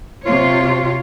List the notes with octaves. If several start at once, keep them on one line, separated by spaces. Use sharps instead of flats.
C3 F4 C#5